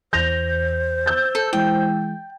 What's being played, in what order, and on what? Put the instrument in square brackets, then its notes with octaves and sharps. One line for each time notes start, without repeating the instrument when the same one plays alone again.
[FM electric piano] E2 E3 [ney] C5 [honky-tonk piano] G6 A#6 F7
[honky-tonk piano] E6 G6 A6
[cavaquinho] A4
[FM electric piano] E3 G#3 E4 [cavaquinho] G5